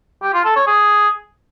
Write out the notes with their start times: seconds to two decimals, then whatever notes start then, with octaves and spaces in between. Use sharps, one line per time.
0.23 G4
0.34 F4
0.45 A4
0.56 C#5
0.67 G#4